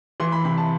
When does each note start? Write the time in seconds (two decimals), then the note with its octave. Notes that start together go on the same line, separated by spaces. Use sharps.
0.20 E3 C6
0.32 B5
0.45 C3 B5
0.58 A5